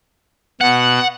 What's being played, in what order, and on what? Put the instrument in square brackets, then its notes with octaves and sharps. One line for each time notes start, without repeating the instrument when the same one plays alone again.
[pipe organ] B2 [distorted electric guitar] F#5